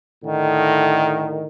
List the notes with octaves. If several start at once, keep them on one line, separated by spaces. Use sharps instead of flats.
A2 D3 D#3